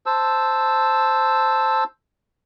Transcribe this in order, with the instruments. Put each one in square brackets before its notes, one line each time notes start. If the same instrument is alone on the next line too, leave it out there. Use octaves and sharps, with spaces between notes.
[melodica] C5 A5 E6